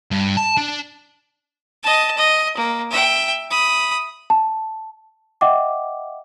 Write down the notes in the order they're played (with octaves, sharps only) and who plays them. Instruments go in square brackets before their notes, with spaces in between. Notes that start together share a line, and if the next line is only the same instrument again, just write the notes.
[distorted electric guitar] G2
A5
D4
[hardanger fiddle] D#5 A5
D#5
A#3
E5 G5
B5 D#6
[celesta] A5
D#5 E5 F#5 G5 D6